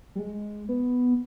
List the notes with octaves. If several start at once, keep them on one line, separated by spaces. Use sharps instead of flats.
G3
G#3
B3